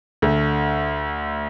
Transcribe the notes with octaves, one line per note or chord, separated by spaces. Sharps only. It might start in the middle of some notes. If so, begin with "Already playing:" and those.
D2 D3